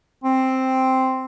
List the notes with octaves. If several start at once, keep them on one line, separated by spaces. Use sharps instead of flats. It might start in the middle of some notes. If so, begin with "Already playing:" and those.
C4